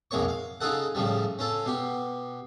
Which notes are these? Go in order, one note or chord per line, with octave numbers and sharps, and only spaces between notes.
B1 F2 G#3 A#3 C#5 C#6
F5
C#3 D#4 F4 G#4 A4 F#5
A2 C#3 F3 G3
C#4 F4 A4
B2 G4